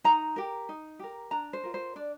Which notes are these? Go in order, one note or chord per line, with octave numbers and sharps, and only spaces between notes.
D#4 A#5
G4 A#4
D#4
G4 A#4
D4 A#5
C5
F4 A#4
C5
D4 D5